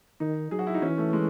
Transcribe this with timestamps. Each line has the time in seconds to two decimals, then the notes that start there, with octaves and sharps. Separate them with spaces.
0.20 D#3 D#4
0.51 F#3 G#4
0.59 F#4
0.67 E4
0.74 D#4
0.82 E3 C#4
0.98 A3
1.13 G#3